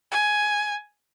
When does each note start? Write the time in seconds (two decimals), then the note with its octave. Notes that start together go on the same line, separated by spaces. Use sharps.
0.11 G#5